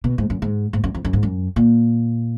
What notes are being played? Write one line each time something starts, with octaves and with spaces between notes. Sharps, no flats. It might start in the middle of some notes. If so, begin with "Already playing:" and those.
B2
G#2
F#2
G#2
G#2
F#2
F2
F#2
G#2
F#2
A#2